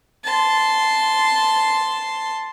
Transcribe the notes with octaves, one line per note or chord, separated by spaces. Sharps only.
A5 C6